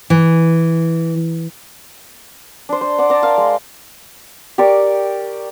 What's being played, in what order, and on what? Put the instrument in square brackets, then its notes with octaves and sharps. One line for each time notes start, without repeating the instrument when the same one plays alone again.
[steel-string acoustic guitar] E3
[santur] D4 C5
C5
D5 F#5 D6
D5 A5 A#5
A#4 F5
G#3
G4 A#4 D5 C#6